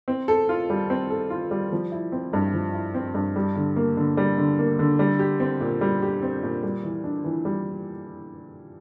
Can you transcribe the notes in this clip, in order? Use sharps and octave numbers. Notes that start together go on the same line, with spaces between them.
C4
A4
F4
G3
C4
A4
F4
G3
F3
E4
C4
G2
F3
E4
C4
G2
G3
D3
A#3
D3
G3
D3
A#3
D3
G3
G4
C4
A#2
G3
G4
C4
A#2
G3
E3
D4
E3
G3